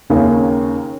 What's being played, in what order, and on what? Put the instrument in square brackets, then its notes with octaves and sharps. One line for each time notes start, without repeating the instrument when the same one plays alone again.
[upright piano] D#2 C#3 A#3